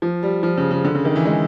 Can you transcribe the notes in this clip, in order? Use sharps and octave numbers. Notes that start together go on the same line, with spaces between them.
F3
G3
F3
C#3
C#3
D3
C#3
D#3
E3
G#3